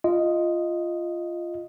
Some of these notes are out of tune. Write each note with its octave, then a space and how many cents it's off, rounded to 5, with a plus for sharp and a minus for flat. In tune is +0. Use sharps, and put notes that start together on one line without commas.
F4 -10 D#5 +0